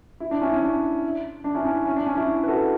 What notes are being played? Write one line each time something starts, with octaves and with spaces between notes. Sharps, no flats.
E4
D4
C#4 E4
C#4
D4
D4
C#4 E4
C#4
C#4
D4
C#4
C#4 E4
B4
F#4 A4